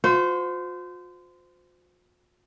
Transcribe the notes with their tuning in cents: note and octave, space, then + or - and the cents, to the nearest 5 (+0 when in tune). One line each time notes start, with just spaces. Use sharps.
F4 +45 C5 -25